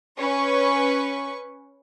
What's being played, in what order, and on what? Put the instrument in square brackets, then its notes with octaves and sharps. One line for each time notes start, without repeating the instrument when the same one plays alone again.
[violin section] C#4 B4 C#6